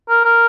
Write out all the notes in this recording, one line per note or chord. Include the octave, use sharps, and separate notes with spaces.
A#4
A#4